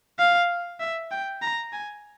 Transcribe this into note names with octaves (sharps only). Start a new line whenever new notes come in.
F5
E5
G5
A#5
G#5